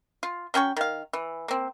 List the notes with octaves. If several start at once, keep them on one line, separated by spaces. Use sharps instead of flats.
F4
F#3 C#4 G5 C#6
D#3 F5
E3
A#3 C4